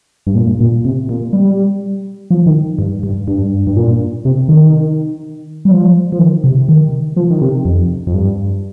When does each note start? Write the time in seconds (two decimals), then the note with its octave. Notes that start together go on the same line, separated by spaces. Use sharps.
0.27 G2
0.35 A#2
0.60 A#2
0.85 C3
1.09 A#2
1.33 G3
2.31 F3
2.46 D#3
2.79 G2
3.03 G2
3.28 G2
3.67 G2
3.76 A#2
4.25 C3
4.49 D#3
5.65 G3
5.71 F3
6.12 F3
6.19 D#3
6.44 C3
6.69 D#3
7.17 F3
7.30 D#3
7.42 C3
7.65 F2
8.07 F2
8.14 G2